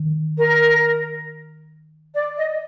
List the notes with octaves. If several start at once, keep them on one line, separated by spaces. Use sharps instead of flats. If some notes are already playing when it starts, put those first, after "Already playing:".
Already playing: D#3
A#4
D5
D#5